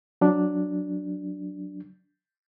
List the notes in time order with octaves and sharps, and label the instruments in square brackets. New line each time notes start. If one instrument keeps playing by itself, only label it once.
[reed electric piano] F#3 D4